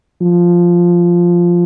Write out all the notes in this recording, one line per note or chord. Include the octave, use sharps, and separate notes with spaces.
F3